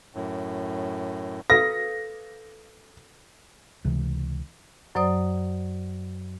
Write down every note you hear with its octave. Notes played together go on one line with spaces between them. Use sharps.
F#2 A2
A4 B4 F5 A#6
C#2 C3 E3
F#2 F#3 C5 D5 D#6